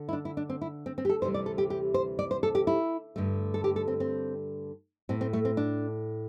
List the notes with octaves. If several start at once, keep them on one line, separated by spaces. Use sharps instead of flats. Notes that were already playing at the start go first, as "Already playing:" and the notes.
Already playing: D3
E4
D4
E4
D4
C4
E4
C4
C4
G4
A4
D2 C3 E3 G3 C5
D5
A4
G4
G4
C5
D5
C5
A4
G4
E4
G2 D3 A3
A4
G4
A4
C4
C4
A2 A3 C4
C4
A3
C4
D4